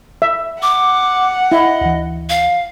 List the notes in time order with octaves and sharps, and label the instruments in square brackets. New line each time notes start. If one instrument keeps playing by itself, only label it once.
[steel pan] E5
[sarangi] F#5 [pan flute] D6
[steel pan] E4 [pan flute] D#5
[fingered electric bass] D2 E3
[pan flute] F5